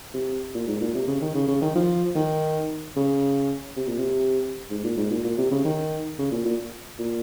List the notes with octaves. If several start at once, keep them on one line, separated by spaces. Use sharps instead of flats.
C3
A#2
G#2
A#2
C3
C#3
D#3
C#3
C#3
D#3
F3
D#3
C#3
C3
A#2
C3
G#2
A#2
G#2
A#2
A#2
C3
C#3
D#3
C#3
A#2
A#2
A#2